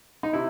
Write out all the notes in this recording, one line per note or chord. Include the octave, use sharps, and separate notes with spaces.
D#4
C3 E4